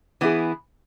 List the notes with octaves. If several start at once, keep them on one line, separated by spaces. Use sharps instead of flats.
E3 B3 E4 G#4